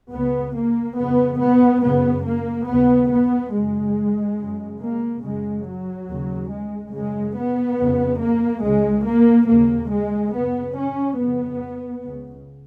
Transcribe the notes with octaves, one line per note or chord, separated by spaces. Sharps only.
C#2 C#3 B3
A#3
F2 C#3 B3
B3
F#2 C#3 B3
A#3
D#2 C#3 B3
B3
F#2 C#3 G#3
F#2 C#3
A#3
F#2 C#3 G#3
F#3
D#2 C#3
G#3
F#2 C#3 G#3
B3
F2 C#3
A#3
C#2 C#3 G#3
A#3
D#2 C#3 A#3
G#3
F#2 C#3 B3
C#4
F2 C#3 B3
C#2 C#3